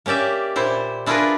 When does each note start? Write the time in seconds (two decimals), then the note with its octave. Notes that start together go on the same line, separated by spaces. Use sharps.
0.06 A#3 C#4 G4 D5 E5
0.56 A#2 E4 C5
1.06 D4 E4 F4 G#4 A#4 B4